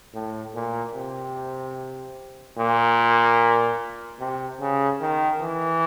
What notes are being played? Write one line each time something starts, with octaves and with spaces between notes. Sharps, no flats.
A2
A#2
C3
A#2
C3
C#3
D#3
E3